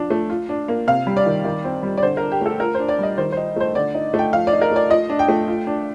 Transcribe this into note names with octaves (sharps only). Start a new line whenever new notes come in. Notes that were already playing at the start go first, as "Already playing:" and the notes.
Already playing: F3 D4
A3
F4
D4
A#3
C3 F5
G3
D5
D#3
D#3
C4
G3
D5
D3 C5
D4 A#4
G4
A3 A4
F4 A#4
C5
D4
D5
G3 D#5
D#3 C5
D#4 C5
A3 C5
D3 D5
D#4
A3 G5
F3 F5
D5
D#4
A#4
A3 D5
F4 D#5
D4
G5
A3
F4
D4